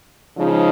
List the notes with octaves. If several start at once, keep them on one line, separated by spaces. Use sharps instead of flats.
C#3 F3 G#3 D#4